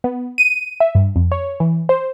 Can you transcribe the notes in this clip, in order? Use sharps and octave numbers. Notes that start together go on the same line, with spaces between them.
B3
D#7
E5
G2
F2
C#5
E3
C5